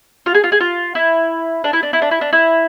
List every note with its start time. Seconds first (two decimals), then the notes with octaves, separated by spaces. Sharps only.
0.26 F4
0.35 G#4
0.44 F4
0.52 G#4
0.60 F4
0.95 E4
1.64 D4
1.73 E4
1.83 D4
1.93 E4
2.02 D4
2.11 E4
2.21 D4
2.33 E4